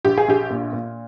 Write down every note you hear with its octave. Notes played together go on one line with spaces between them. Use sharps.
A#1 G4
G#4
A#1 G4
A#2
A#2